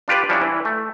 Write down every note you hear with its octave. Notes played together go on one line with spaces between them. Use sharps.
D4 F4 G4 B4 D5
F3 G3 C#4 D4 E4
E3
A3